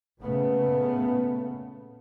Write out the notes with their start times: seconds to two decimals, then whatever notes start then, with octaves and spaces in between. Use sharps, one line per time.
0.21 A#2 C#3 A3 B3